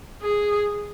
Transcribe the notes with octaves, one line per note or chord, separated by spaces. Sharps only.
G#4